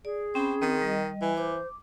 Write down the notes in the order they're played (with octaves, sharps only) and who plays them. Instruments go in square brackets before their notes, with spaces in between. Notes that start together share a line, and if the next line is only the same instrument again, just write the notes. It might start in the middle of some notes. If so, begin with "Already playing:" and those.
[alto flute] G#4 [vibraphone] D5
[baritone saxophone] C4 [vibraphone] C#4 G5 B5
[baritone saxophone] D#3 [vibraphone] C4
[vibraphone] G3 D#5
[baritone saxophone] E3 [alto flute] G#5
[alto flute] C5 [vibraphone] D6